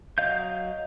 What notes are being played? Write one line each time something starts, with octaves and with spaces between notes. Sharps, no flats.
F#3 D#5 F5 G6